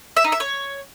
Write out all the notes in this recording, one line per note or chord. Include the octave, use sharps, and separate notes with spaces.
E5
D#4
E5
C#5